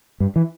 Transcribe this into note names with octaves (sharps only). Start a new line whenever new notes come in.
G2
E3